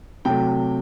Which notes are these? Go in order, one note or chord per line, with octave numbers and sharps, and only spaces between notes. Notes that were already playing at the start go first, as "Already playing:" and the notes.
C3 F#3 A3 G5